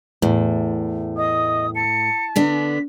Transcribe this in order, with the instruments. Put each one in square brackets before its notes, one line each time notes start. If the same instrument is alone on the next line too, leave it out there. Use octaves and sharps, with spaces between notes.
[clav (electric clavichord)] E2 [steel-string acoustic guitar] A2
[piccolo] D#5 [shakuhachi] D#6
[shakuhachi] A5 [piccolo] C#7
[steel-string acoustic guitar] D3 B3 D4 [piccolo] B6